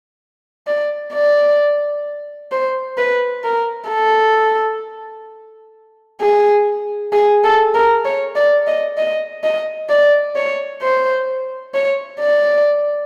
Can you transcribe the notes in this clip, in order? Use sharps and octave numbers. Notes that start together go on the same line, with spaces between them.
D5
D5
C5
B4
A#4
A4
G#4
G#4
A4
A#4
C#5
D5
D#5
D#5
D#5
D5
C#5
C5
C#5
D5